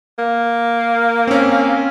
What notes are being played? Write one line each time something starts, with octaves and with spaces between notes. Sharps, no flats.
A#3
C4 C#4